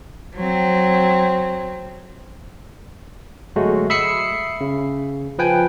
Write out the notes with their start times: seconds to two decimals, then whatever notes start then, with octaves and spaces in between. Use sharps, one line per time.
0.35 F#3 C4
3.56 G1 F#3 G#3 A3 F#4
3.90 E5 B5 D#6 E6 C7 C#7
4.61 C#3
5.39 F3 B4 G5 G#5